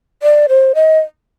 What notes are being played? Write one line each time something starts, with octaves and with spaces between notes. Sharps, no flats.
D5
C5
D#5